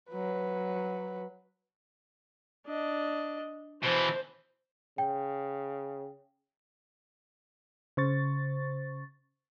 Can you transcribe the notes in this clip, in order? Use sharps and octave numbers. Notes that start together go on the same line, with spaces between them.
F#3 B4
D4 D#5
B2 E3 C5
C#3 G5
C#3 C5 C#6 A6